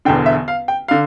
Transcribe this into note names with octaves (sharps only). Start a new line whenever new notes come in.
E1 E2 D3 G5
E5
F5
G5
D3 F5